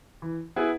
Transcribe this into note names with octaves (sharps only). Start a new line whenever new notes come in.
E3
B3 E4 G#4 B4